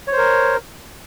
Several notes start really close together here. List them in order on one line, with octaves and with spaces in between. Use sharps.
C#5 C5 A#4